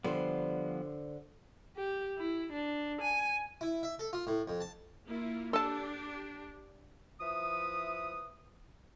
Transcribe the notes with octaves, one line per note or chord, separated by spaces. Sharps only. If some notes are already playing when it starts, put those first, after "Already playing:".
D3 F3 G3 B3 C5
G4
E4
D4
G#5
E4
E5
A4
F4
A2
F2
A5
A#3 E4 F4
D4 G4 A4 A5
F3 E4 B4 E5 D#6